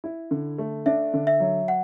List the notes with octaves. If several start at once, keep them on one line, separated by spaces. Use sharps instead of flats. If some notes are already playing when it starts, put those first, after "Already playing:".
E4
D3
A3
D4 E5
D3
E5
F#3
F#5